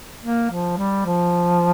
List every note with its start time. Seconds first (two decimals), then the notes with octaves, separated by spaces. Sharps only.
0.22 A#3
0.50 F3
0.78 G3
1.05 F3